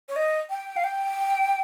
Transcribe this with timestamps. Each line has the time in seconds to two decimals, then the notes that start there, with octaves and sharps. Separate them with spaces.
0.09 C#5
0.16 D#5
0.50 G5
0.77 F5
0.84 G5